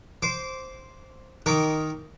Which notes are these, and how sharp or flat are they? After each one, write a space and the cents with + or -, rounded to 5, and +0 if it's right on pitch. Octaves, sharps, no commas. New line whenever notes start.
C5 +0 D6 -20
D#3 +0 A#4 +0 D6 -35